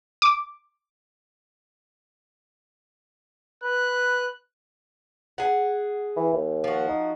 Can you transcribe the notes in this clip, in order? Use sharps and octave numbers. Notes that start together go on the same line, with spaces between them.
D6
B4 F#6
G#4 F#5
E3
D#2
F3 F#4
D#4